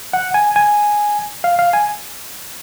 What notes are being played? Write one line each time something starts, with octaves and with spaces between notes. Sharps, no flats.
F#5
G#5
G#5
F5
F5
G#5